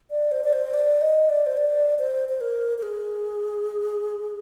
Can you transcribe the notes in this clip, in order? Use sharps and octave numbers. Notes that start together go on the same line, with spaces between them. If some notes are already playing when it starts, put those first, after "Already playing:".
D5
C5
D5
C5
D5
D#5
D5
C5
D5
C5
C5
A#4
A#4
G#4